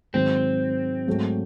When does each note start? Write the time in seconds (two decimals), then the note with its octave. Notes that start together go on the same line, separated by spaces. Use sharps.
0.14 G#2 D#3 F#3 C4
1.07 G#2 F#3 A3